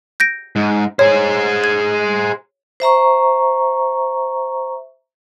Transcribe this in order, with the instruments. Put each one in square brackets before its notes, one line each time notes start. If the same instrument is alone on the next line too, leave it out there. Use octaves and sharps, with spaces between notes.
[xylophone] G6 A#6 D7
[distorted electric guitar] G#2
[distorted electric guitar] G#4 C5 [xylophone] C#5
[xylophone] G#6
[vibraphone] C5 E5 A#5 C#6